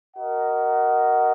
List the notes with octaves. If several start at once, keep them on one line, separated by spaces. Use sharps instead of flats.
F#4 A#4 D#5 F#5